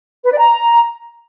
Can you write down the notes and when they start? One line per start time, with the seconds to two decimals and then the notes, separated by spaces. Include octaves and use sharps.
0.24 B4
0.31 D5
0.39 A#5